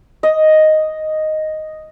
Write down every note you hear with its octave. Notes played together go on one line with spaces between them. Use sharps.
D#5